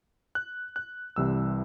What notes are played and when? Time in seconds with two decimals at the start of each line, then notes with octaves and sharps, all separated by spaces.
0.35 F#6
0.76 F#6
1.16 C2 C3 E3 G3 C4 E6